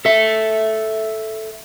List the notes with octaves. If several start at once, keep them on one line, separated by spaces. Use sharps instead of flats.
A4 E5